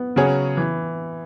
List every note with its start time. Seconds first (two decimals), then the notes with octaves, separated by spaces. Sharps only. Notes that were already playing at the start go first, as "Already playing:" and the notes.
Already playing: B3
0.16 C#3 F#3 C#4 G#4 C#5
0.57 E3